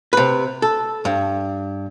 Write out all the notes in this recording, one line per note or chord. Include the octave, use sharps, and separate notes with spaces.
C3 B4
A4
G2